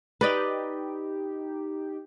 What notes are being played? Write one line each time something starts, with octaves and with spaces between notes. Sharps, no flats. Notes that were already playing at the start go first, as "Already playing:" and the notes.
D#4 G4 B4 D5 D#5